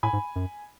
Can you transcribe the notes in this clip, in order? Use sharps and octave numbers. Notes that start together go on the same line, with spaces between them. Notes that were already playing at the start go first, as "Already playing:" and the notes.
A2 G#5 B5
G#2
F#2